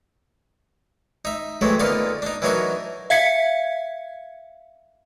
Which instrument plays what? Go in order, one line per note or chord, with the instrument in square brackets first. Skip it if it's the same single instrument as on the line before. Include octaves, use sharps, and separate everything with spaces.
[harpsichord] D#4 E5
E3 F#3 G#3 A3 C4
A#2 D3 B3 D#4 F5 C6
D4 D#4
E3 F#3 D4 D#4 F#4 A#4
[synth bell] E5 F5 G#6 B6 C#7